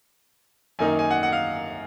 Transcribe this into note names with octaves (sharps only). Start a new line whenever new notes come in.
F#2 D#3 A#3 D#4 G#5
G#5
F#5
F#5
F5